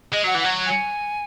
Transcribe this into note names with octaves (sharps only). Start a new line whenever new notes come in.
G#3 D#5
F#3 F#5
E3
F#3 F#5
G#5